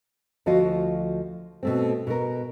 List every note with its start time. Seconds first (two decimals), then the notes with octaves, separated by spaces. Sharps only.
0.46 D2 F3 F#4 D#5 F5
1.63 B2 A3 C4
2.07 B2 A#4